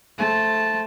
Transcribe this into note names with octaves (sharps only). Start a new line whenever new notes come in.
A3 C5 A5